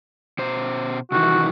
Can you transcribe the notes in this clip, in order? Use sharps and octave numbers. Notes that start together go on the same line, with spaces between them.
B2 C5
C3 D#3 E3 F#4